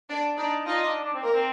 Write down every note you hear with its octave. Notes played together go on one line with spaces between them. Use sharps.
D4 D5
D4 D#4 D5
D#4 F4 D#5
D4
D4
C4
A#3 A#4
C4